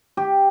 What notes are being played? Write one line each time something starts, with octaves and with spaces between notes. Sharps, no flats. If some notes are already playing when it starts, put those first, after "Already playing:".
G4